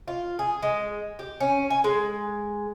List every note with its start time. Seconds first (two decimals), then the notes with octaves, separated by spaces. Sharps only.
0.08 F4
0.39 G#4
0.62 G#3
1.19 G4
1.40 C#4
1.70 G#5
1.84 G#3